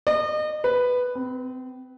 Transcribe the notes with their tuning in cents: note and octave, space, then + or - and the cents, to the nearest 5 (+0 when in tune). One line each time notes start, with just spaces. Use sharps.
D#5 -35
B4 +5
C4 -30